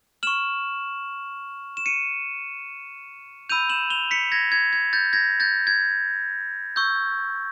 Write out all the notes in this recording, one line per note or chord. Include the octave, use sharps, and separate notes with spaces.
C#6 F6 E7 F#7
E7
C#7 D#7
B5 E6 G6 D#7 F7
E7 F#7
F7 G7
B6 C#7
G#6 A#6
G#6
G#6
G6 A6
G#6 A#6
G6 A6
G#6
C#6 E6 G6